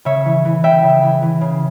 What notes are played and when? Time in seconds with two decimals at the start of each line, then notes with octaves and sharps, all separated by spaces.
0.05 C#3 C#5 E5
0.26 E3
0.45 E3
0.63 C#3 E5 G5
0.83 C#3
1.03 E3
1.22 E3
1.41 C#3